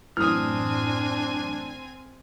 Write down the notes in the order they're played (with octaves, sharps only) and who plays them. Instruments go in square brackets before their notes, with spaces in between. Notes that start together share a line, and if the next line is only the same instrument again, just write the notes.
[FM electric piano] F#2 A2 E3 [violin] C4 G#5 [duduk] D4 [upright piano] D#6 F6